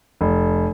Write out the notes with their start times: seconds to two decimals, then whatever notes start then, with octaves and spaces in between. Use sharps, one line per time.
0.21 F1